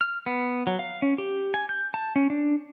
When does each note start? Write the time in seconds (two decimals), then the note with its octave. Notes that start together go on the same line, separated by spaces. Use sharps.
0.01 F6
0.26 B3
0.67 F#3
0.79 F5
1.02 C#4
1.18 G4
1.54 G#5
1.69 G6
1.94 A5
2.16 C#4
2.30 D4